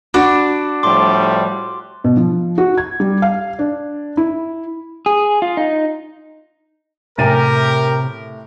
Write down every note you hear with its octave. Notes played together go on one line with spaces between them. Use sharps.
D4 F#4 B5
A2 F3 G3 C6 D6
B2
F3
F#4
G#6
G3
F5
D4
E4
G#4
F4
D#4
A2 C3 G4 A#4 G#5 A6 D#7